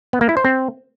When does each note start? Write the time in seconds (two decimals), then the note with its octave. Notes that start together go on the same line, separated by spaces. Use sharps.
0.13 B3
0.21 A#3
0.29 E4
0.37 C5
0.45 C4